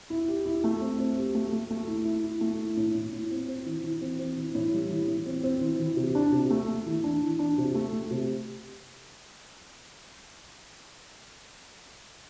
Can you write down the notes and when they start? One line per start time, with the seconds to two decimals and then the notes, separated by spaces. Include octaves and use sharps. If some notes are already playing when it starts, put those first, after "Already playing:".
0.10 E4
0.28 G4
0.46 E4
0.64 A3
0.81 C4
0.99 C4
1.17 G4
1.35 A3
1.53 A3
1.70 A3
1.88 E4
2.05 E4
2.24 E4
2.41 A3
2.59 E4
2.77 A2
2.95 A2
3.13 A2
3.31 C4
3.48 C4
3.66 E3
3.84 E3
4.01 C4
4.19 C4
4.37 E3
4.55 A2
4.73 G3
4.91 E3
5.08 A2
5.26 C4
5.44 C4
5.61 E3
5.80 E3
5.97 C3
6.15 D4
6.32 C3
6.50 A3
6.68 A3
6.86 E3
7.04 D4
7.22 E3
7.39 D4
7.58 C3
7.75 A3
7.93 A3
8.11 C3